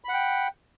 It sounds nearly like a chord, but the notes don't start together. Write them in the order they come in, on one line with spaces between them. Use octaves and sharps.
B5 F#5 G5